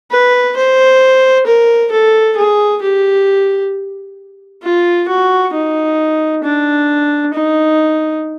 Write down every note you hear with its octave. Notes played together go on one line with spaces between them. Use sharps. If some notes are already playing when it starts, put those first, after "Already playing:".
B4
C5
A#4
A4
G#4
G4
F4
F#4
D#4
D4
D#4